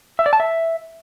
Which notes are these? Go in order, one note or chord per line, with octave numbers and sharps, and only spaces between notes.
E5
D5
A5
E5